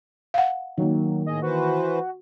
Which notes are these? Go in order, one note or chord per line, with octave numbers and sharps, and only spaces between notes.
F5 F#5
D#3 F#3 A#3
A2 G#4 D#5
E3 F#4 B4 C5